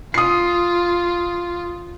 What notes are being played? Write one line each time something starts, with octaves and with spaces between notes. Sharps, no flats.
F4 D#6 C7